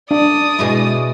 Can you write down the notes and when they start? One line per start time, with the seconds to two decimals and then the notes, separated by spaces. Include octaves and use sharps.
0.11 D4 D5 D#6
0.59 B2 G#3 E4